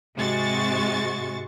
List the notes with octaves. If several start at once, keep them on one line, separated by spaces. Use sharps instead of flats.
G#2 C3 G#3 F#4 C#6 A6